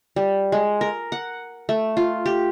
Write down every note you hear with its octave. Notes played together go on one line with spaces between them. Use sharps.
G3
G#3
A#4
F#5
A3
F4
G4